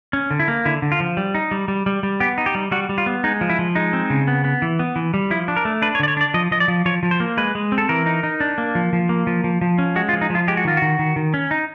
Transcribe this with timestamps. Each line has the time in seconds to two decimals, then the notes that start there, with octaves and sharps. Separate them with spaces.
0.13 C#4
0.31 D3
0.39 E4
0.48 A#3
0.65 D3 E4
0.82 D3
0.92 F4
1.00 F3
1.17 G3
1.35 D#4
1.51 G3
1.68 G3
1.86 G3
2.03 G3
2.20 B3 G4
2.38 D#4
2.46 G4
2.55 G3
2.71 G3 F#4
2.89 G3
2.98 F4
3.06 B3
3.24 G#3 D#4
3.41 F3
3.50 E4
3.59 F3
3.75 G#3 D#4
3.93 C4
4.10 C#3
4.27 B3
4.44 B3
4.62 E3
4.79 B3
4.96 E3
5.14 G3
5.31 F3 E4
5.48 D4
5.56 A#4
5.65 A3
5.82 D4 B4
5.95 C#5
6.00 D3 D5
6.08 C#5
6.17 D4 D5
6.34 F3 D#5
6.51 F3 D#5
6.60 D5
6.68 F3
6.86 F3 C#5
7.03 F3
7.11 C5
7.20 A#3
7.37 G#3 B4
7.55 G#3
7.72 C4
7.78 A4
7.89 E3 A#4
8.06 D#4
8.23 D#4
8.40 D4
8.58 A#3
8.75 F3
8.93 F3
9.09 A#3
9.27 F3
9.44 F3
9.61 F3
9.78 C#4
9.96 G#3 F#4
10.09 F4
10.13 F3
10.21 D#4
10.30 F3 F4
10.48 G#3 G4
10.57 F#4
10.65 D#3 F4
10.77 D#3 F#4
10.99 D#3
11.16 D#3
11.34 C#4
11.51 D#4